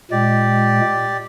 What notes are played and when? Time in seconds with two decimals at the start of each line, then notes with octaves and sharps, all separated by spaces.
0.11 A#2 G#3 G4 D5